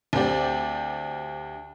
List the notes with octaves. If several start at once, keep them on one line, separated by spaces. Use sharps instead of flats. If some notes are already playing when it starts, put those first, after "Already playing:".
D2 C4 G4 D5